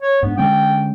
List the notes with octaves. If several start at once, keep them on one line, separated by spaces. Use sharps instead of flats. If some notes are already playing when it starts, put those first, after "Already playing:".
C#5
G#2 B3 D4
D3 G#3 C#4 G5